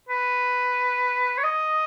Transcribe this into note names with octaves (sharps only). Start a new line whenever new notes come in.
B4
C#5
D#5